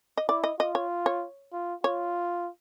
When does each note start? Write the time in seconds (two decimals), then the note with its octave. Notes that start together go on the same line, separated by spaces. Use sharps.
0.17 D#5
0.29 E4 D5
0.44 D#5
0.59 F4 D#5
0.75 C#5
1.06 C#5
1.53 F4
1.84 F4 C#5